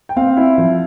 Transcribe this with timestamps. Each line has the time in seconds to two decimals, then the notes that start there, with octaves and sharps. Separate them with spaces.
0.09 G5
0.16 C4 F5
0.37 E4
0.58 F3